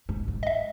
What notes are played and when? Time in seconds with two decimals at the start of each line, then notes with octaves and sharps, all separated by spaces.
0.09 G#2
0.28 G#2
0.43 D#5
0.47 E5